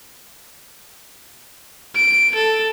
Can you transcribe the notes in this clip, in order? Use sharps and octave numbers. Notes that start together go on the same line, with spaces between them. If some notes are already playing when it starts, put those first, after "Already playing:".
D7
A4